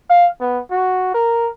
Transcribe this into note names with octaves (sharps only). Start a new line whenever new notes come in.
F5
B3
F#4
A#4